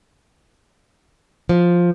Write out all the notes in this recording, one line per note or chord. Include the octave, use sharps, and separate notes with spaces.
F3